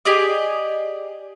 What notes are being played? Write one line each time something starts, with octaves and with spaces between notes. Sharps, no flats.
G4 G#4 D5 D#5